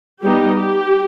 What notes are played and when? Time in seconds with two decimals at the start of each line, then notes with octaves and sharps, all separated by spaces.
0.22 G3 B3 D#4 G4
0.57 G4